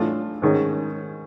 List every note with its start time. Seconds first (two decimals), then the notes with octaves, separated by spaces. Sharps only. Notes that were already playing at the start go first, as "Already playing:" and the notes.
Already playing: A2 E3 A3 D4 F4
0.42 G#2 D#3 G#3 C#4